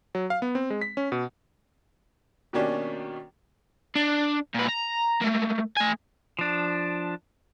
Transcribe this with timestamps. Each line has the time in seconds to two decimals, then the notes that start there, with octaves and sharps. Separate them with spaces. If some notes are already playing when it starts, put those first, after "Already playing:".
0.15 F#3
0.30 F5
0.42 B3
0.55 C4
0.70 G#3
0.81 B6
0.97 C#4
1.12 B2
2.53 B2 D#3 A#3 C#4 D4 G4
3.96 D4
4.54 A#2 B4
4.68 A#5
5.22 A3 A#3
5.77 A3 G#5
6.39 F3 D4